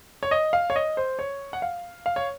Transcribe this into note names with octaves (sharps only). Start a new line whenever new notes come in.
C#5
D#5
F5
C#5
D#5
C5
C#5
F#5
F5
F5
C#5